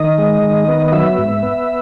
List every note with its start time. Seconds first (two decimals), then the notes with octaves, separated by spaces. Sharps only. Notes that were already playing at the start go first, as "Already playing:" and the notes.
Already playing: D#3 D#5
0.18 G#3
0.43 D#3
0.68 B3
0.88 D#5
0.92 F#3 E5
1.18 G#2
1.43 B3